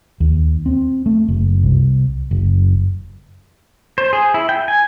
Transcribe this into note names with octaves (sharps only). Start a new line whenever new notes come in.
D#2
C4
A3
F#1
C2
F#1
C5
G#4
E4
G5
G#5